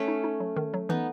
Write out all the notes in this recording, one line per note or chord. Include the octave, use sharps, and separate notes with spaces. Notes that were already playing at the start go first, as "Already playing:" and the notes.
Already playing: A3 C#4
D#4
D#4
F#3
D#3
F#3
E3 B3 D#4